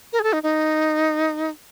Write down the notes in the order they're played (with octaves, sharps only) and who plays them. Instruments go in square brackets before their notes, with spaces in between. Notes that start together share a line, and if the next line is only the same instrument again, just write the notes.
[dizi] A#4
G#4
A4
D#4
D#4